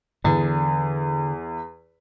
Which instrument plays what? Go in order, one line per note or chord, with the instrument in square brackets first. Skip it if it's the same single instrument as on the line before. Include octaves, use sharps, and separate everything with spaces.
[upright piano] E2 [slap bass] D3